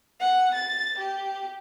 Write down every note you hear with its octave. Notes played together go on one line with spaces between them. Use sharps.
F#5
A6
G4